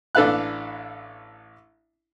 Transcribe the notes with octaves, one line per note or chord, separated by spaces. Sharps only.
A1 D4 A4 B4 F5 F#6